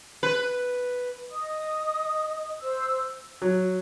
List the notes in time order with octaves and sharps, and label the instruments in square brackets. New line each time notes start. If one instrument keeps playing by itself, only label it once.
[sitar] B4
[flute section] D#5 D#6
C5 E6
[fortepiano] F#3